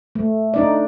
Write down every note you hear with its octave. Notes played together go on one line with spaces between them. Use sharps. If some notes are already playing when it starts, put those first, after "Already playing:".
A3
D4 D#4 D5